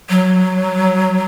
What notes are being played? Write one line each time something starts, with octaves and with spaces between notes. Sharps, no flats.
F#3